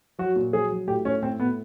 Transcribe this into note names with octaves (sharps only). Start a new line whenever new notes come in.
F#3 F#4
A#2
F#3 G#4
F#3
A2 G4
A2 C#4
A2 C4
A2 B3